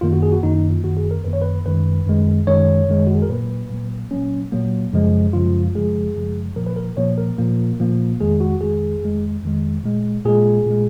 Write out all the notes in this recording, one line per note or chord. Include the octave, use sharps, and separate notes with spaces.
F#2 D#3 A#3 F4
F#4
G#4
F#4
F#2 D#3 A#3 D#4
D#4
F4
F#2 D#3 A#3 F#4
G#4
A#4
F#2 D#3 A#3 B4
C#5
B4
F#2 D#3 G#3 B4
F#2 D#3 G#3
F#2 D#3 G#3 C#5
F#2 D#3 G#3
F#4
G#4
A#4
A#2 F#3 A#3 B4
A#2 F#3 A#3
A#2 F#3 A#3 C#4
A#2 F#3 A#3
F#2 C#3 F3 G#3
F#2 C#3 F3 G#3 F4
F#2 C#3 F3 G#3 G#4
F#2 C#3 F3 G#3
A#2 F3 A#3 A#4
B4
A#4
A#2 F3 A#3 C#5
A#4
A#2 F3 A#3
A#2 F3 A#3
F2 D#3 G#3 G#4
F#4
F2 D#3 G#3 G#4
F2 D#3 G#3
F2 D#3 G#3
A#2 G#3
A#2 G#3 G#4
A#2 G#3